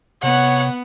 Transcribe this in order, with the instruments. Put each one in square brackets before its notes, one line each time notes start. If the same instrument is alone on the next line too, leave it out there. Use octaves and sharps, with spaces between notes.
[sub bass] C3 [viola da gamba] B3 [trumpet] C#5 [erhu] F#5